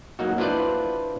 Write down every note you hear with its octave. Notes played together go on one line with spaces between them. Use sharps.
F#3 A#3 D#4 F#4
D4 E4 F4 B4 C5 D5